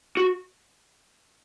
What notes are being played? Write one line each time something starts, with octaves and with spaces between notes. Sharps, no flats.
F#4